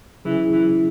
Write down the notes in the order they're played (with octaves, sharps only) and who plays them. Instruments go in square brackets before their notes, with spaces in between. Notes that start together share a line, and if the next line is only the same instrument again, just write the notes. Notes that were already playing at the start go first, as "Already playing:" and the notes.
[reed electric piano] C#3 F#3 C#4 G#4 [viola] E3
[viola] E3